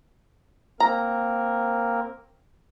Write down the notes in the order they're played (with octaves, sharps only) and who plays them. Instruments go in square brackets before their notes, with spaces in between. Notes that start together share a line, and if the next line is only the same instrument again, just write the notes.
[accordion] A#3 C4 A#4 [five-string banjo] A#5